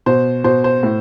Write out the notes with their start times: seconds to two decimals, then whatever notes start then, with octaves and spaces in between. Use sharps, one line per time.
0.06 B2 C5
0.44 B2 C5
0.64 C5
0.83 A2